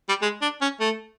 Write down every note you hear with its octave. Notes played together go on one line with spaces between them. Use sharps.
G3
G#3
D4
C#4
A3